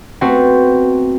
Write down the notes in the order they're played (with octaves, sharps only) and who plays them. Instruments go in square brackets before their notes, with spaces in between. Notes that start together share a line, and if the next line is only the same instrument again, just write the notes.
[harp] A3 B3 C4 F#4